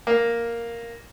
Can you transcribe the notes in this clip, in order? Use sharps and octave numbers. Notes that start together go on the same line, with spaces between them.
A#3